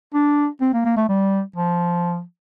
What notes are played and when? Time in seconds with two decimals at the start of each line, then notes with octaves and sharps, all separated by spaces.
0.14 D4
0.61 C4
0.74 A#3
0.85 A#3
0.97 A3
1.09 G3
1.56 F3